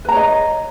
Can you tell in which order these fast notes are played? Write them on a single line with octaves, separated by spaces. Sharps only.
B4 A#5 C#5 D#5